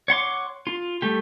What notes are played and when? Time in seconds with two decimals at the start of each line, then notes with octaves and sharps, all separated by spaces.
0.08 C#5 F#5 C6 D6
0.67 F4
1.02 G3 A3 G4